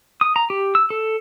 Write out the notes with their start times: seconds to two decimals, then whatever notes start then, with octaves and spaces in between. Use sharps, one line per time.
0.21 D#6
0.36 A#5
0.50 G4
0.75 E6
0.90 A4